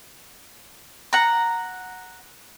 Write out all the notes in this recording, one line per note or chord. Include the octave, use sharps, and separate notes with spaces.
F#5 A#5